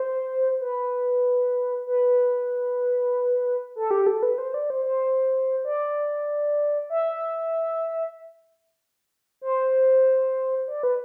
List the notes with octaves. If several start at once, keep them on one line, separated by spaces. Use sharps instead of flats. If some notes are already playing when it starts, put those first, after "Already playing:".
Already playing: C5
B4
B4
A4
G4
A4
B4
C5
D5
C5
C5
D5
E5
C5
D5
B4